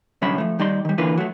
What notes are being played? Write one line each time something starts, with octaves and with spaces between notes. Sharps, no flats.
C2 D3 F#3 C#4 E5 B5
F3 A3
D#2 G3 D#4 D5 C6
D#3 G3
D3 E3 A#3 F4 B4
F#3 A3